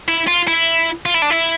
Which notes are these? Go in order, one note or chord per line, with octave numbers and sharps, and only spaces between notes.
E4
F4
E4
F4
E4
D4
E4